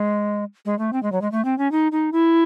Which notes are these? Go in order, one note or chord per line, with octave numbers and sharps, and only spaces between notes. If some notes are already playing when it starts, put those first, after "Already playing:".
Already playing: G#3
G#3
A3
C4
G#3
F#3
G#3
A3
C4
C#4
D#4
D#4
E4